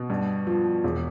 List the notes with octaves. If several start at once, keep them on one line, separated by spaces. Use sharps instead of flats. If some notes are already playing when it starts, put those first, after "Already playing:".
Already playing: B2
G2
F3
E1